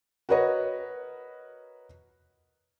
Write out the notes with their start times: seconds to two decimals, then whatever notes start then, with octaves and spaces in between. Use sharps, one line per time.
0.29 F#4 A#4 B4 C#5 D#5